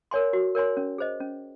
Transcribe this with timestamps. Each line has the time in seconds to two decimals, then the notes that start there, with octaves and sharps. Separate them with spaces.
0.11 A#4 C#5 G#5 C6
0.33 F#4
0.55 A#4 C#5 G#5 C6
0.77 C#4
0.98 G#4 C5 D#5
1.20 C#4